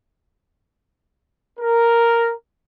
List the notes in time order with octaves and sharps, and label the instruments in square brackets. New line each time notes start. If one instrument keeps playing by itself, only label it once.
[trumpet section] A#4